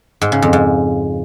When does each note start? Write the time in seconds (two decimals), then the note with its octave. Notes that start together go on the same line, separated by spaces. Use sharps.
0.21 G#2
0.32 C#3
0.42 F2
0.53 G#2